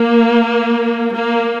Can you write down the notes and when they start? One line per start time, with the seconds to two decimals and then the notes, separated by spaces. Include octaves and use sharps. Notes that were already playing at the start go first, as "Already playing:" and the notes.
Already playing: A#3
1.14 A#3